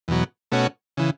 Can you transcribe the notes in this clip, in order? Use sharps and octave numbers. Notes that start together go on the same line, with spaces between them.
E2 B2 F#3
B2 A3 C#4 F#4
C#3 E3